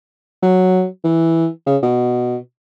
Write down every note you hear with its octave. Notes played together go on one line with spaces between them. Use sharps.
F#3
E3
C#3
B2